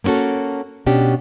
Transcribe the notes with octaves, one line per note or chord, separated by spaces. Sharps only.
A#3 B3 C#4 F#4 A4
B2 C#4 D4 G4